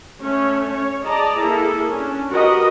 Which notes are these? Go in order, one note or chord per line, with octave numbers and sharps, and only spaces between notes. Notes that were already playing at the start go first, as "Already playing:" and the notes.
A3 C#4 C#5
C#4 C#5
G#4 D5 D#5 A5 A#5
A#3 E4 G#4 A4
C#4 D4
F#4 G4 A#4 B4 D#5